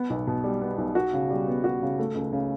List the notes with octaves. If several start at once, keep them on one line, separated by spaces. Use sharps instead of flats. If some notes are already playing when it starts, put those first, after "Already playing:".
Already playing: B3
B1
B2
G3
B3
B1
F#4
C#3
G3
B3
F#4
C#3
A3
C#2
C#3